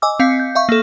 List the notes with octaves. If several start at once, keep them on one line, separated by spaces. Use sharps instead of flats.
D#5 G#5 D6 E6
C4 F5 B6 C#7
G6
E5 F5 C#6
A#3 A4